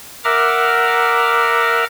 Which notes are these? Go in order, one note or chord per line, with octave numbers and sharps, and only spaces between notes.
A#4 E5 F#5 A#5 D6 F6